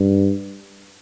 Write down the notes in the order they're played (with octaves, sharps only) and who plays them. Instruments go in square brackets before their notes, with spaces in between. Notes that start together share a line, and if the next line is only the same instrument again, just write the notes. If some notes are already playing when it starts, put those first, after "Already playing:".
Already playing: [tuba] G2